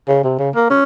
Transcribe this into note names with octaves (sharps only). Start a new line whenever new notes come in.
C#3
C3
C#3
A#3
C#4